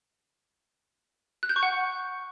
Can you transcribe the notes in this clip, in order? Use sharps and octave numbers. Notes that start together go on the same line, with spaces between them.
F#6
G6
C#6
F#5